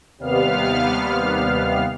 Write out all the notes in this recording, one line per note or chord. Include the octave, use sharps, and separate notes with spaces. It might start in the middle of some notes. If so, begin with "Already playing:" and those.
D#2 C3 G3 B3 F5 F6